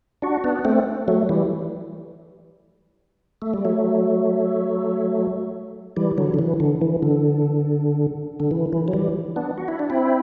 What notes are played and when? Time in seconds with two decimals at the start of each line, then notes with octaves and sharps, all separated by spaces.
0.22 D4 F#4
0.44 B3 D4
0.65 A3 C4
1.08 F#3 A3
1.29 E3 G3
3.42 A3
3.54 G3
3.65 F#3 A3
5.96 E3 G3
6.18 D3 F#3
6.34 D3
6.39 E3
6.60 D3
6.81 E3
7.03 D3
8.40 D3
8.51 E3
8.73 E3
8.88 F#3
8.94 E3 G3
9.36 B3 D4
9.58 F#4
9.68 E4
9.79 D4
9.90 C4 E4